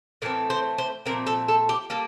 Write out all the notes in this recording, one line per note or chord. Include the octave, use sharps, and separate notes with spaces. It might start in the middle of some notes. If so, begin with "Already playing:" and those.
A2 E3 A3 C4 A#4
C5
C5
A#2 F3 A3 C4 A#4
A4
A4
G4
G3 A#3 A4